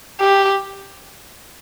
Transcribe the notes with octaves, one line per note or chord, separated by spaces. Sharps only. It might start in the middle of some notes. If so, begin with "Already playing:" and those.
G4